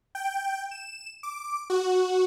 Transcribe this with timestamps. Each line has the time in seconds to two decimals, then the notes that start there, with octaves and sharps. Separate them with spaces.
0.15 G5
0.71 E7
1.23 D6
1.70 F#4